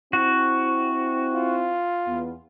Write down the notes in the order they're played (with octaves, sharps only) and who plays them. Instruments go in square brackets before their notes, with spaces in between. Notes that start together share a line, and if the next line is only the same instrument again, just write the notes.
[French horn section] C4 E4 [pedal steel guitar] F#4
[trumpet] F4
[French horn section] E2 B3